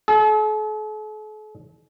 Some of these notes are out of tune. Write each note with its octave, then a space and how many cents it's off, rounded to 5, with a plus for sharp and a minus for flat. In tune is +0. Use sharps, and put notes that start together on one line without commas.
A4 -45